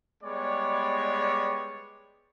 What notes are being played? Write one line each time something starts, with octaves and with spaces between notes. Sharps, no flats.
G3 G#3 B3 C#5 D5